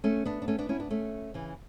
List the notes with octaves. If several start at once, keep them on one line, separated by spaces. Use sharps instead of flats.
A3 C#4
B3 D4
D4
A3 C#4
B3 D4
C#4 E4
B3 D4
A3 C#4
C#3 E3